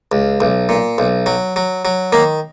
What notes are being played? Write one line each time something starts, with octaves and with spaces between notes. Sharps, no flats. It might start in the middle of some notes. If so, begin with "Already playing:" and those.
C#2
B1
A#2
B1
F#3
F#3
F#3
D#3 A#3